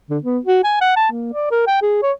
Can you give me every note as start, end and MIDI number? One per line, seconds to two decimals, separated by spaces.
0.10 0.18 50
0.24 0.39 59
0.45 0.60 66
0.64 0.78 80
0.81 0.96 78
0.96 1.10 81
1.11 1.30 58
1.34 1.47 74
1.51 1.65 70
1.67 1.78 79
1.82 1.98 68
2.03 2.12 73